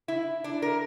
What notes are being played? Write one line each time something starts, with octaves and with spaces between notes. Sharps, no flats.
E4
D4
A#4